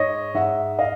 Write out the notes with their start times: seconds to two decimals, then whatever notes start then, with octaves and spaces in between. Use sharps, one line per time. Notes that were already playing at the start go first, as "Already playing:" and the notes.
Already playing: G#2 C#5 D#5
0.34 G#2 E5 F#5
0.79 D#5 F5